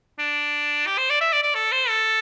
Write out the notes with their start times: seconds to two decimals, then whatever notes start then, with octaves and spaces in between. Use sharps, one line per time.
0.19 D4
0.86 G4
0.98 C5
1.10 D5
1.21 E5
1.33 D5
1.43 D5
1.55 A4
1.72 C5
1.89 A4